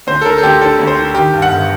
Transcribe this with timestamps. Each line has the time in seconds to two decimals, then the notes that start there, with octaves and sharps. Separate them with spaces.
0.07 D2 C5
0.21 A4
0.25 D3 A#4
0.38 A4
0.43 D2 G4
0.61 D3 A4
0.79 D2
0.87 C5
0.97 D3
1.14 D#3 G4
1.34 G2
1.42 F#5
1.52 G1